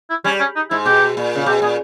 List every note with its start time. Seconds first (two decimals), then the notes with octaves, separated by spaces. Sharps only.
0.10 E4
0.24 G3 C#4
0.40 C#4
0.56 D#4
0.70 G#2 E4
0.86 B2 G4
1.17 A#2
1.35 C#3
1.46 B2 G4
1.62 A#2 G#4